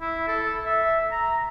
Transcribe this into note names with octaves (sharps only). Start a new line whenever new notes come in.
E4
A4
E5
A#5